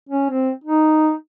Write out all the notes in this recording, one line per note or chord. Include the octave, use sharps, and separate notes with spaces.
C#4
C4
D#4